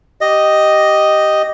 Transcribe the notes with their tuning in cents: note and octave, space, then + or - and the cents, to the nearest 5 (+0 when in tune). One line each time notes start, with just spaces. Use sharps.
G4 -10 D#5 +0